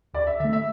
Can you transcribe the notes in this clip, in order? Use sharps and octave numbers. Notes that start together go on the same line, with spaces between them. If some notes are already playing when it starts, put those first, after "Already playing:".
D2 D5
E5
D3 A3 E5
E5